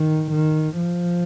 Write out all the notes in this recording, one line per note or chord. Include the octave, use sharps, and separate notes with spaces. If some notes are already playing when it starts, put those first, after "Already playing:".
Already playing: D#3
D#3
F3